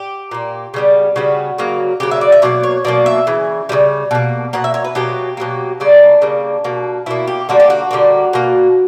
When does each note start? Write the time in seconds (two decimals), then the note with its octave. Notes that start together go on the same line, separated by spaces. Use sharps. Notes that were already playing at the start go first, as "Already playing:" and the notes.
Already playing: G4
0.31 A#2 A#3
0.74 C#3 G3 B3
1.16 C#3 G3 B3 F#4
1.58 C#3 F#3 A#3
2.00 C#3 F#3 A#3 G4
2.11 E5
2.21 D5
2.32 E5
2.42 B2 F#3 A#3 D5
2.64 C#5
2.85 B2 F#3 A#3 D5
3.06 E5
3.27 C#3 E3
3.69 C#3 E3 G3
4.11 B2 A#3
4.53 B2 A#3 F#5
4.64 E5
4.74 C#5
4.85 B4
4.95 B2 F#3 A#3 G4
5.37 B2 F#3 A#3
5.80 C#3 G3 A#3 D4
6.22 C#3 G3 A#3
6.64 B2 A#3
7.06 B2 A#3 E4
7.27 G4
7.49 D3 G3 A#3 F#4
7.60 G4
7.70 F#4
7.91 D3 G3 A#3
8.33 B2 A#3